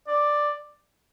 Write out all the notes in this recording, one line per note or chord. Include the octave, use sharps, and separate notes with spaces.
D5